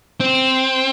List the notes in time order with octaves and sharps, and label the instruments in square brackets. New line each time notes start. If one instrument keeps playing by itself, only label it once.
[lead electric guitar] C4